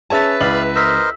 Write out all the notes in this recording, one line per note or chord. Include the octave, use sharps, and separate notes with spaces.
C#4 G#4 B4 C#5 E5 A5 A6
C#2 E4 D5 F5 B5 F#7
A#4 C5 D#5 E6 B6